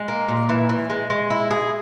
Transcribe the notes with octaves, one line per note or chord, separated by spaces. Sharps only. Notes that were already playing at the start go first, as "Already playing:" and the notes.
Already playing: G#3
A#3
A#2
E3
E3
G#3
G#3
E4
G#4